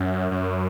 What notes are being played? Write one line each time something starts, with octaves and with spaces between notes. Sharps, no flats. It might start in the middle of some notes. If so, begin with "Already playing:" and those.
Already playing: F#2
F#2